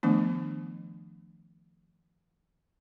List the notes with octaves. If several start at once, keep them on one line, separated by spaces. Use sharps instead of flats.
D#3 F3 A3 B3 D4